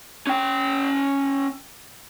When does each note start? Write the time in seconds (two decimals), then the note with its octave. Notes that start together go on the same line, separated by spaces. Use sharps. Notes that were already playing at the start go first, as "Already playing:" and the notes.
0.27 C#4 G5